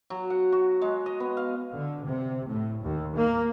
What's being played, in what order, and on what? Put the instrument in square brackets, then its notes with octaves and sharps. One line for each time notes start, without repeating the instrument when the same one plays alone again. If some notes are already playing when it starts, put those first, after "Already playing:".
[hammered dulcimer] F#3
F#5
F#4
G#3
D#5
B3
F5
[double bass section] D3
C3
A2
D#2
A#3